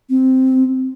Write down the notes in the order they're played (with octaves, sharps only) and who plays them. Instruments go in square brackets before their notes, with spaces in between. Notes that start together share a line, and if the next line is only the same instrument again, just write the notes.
[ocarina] C4